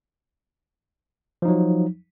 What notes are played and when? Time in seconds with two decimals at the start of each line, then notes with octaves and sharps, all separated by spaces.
1.42 F3
1.45 D#4
1.48 F#3